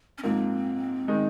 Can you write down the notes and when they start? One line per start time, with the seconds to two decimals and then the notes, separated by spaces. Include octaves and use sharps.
0.18 C#4
0.23 G#2 F3 A#3 C4
1.08 D#3 G#3 D#4